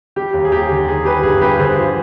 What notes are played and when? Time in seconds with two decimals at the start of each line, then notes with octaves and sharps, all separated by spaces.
0.16 G3 G4
0.33 D#2
0.45 G#4
0.51 D#2 G4
0.70 D3
0.87 D#3 G#4
1.05 G3 G4 B4
1.23 G1 G#4
1.41 G2 G4 B4
1.59 D3 G#4 C5
1.78 F3